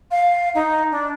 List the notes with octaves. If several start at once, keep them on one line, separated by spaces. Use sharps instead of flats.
F5
D#4
D4